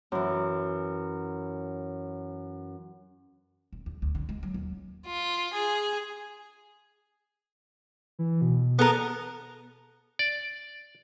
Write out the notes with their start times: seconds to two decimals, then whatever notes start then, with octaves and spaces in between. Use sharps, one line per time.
0.12 F#2 E3
3.73 D#1
3.86 E2
4.02 D2
4.15 D3
4.29 G#3
4.43 F#3
4.54 D#2
5.07 F4
5.54 G#4
8.19 E3
8.41 B2
8.79 B3 A4 A#4
10.19 D5